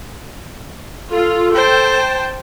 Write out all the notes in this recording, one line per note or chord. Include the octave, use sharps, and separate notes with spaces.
F4 A4
C5 G5 A5